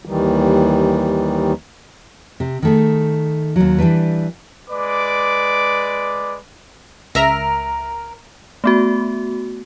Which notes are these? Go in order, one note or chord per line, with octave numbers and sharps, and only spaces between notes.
D#2 D#3 E3 G3
C3
D#3 A3 G#4
D#2 F#3
E3 G3 D4 B4
G#3 B4 D5 D6
C#2 A#4 E5 A#5
A3 B3 F#4